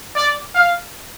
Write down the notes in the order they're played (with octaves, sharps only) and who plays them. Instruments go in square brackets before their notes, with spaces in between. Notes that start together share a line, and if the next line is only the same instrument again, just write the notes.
[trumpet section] D5
F5